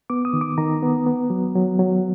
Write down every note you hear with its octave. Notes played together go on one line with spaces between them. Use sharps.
B3 D6
D#6
D#3
D6
D#3 A#5
B3
B3
F#3
F#3
F#3